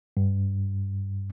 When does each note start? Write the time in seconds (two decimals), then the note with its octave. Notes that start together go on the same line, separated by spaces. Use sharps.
0.17 G2